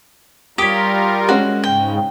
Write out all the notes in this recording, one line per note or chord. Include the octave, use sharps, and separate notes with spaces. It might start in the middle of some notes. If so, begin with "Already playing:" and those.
G3 F4 G4 A#4 C#5 D#6 B6
G#3 C#4 F#4
G#2 C#3 G5